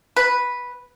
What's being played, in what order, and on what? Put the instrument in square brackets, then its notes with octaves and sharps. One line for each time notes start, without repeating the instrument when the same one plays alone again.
[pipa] B4